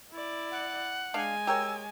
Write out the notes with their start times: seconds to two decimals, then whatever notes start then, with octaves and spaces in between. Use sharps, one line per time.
0.12 E4 D5
0.51 F#5
1.14 G#3 D4 F5 G#5
1.47 G4 A#4 C#5 E6